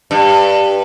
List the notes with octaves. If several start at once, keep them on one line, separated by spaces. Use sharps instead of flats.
G2